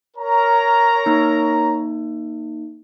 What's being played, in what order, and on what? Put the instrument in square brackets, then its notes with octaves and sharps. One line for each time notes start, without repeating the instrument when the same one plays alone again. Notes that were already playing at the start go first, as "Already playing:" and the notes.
[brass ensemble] A#4 C#5 A#5
[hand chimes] A#3 D#4